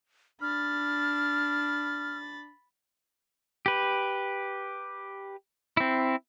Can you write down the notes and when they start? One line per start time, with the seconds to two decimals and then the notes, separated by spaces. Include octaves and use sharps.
0.41 D4 B5 F6 A6
3.66 G4 B4
5.77 C4 E4